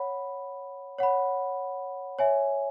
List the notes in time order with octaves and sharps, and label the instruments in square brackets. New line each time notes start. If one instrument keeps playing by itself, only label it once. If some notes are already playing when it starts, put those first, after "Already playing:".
Already playing: [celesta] C#5 F#5 B5
C#5 F#5 B5
C#5 E5 G#5